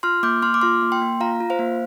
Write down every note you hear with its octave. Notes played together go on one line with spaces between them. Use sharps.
F4 C6 F6
A#3 D6 G6
A#3 C6 F6
D6
F4 C6 F6
A#3
G5 C6
A#3
F4 F5 A#5
F4
C5 F5
A#3